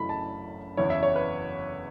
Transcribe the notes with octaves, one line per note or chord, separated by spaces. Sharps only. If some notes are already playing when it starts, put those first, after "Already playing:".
Already playing: F#1 F#2 C#3 E3 A3 B5
A5
F#1 E2 E3 B3 E4 C#5
E5
C#5
B4